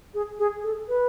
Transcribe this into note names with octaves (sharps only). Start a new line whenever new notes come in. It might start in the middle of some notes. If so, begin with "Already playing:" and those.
G#4
G#4
A4
B4